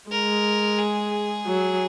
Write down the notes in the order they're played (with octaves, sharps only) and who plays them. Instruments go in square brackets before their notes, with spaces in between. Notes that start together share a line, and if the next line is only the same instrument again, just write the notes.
[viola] G#3 [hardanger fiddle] A#4
[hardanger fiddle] G#4
[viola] F#3